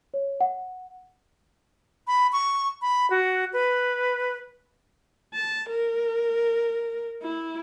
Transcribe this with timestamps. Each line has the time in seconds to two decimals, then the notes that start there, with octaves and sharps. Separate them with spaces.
0.14 C#5
0.41 F#5
2.07 B5
2.33 C#6
2.82 B5
3.10 F#4
3.53 B4
5.34 A5
5.69 A#4
7.22 E4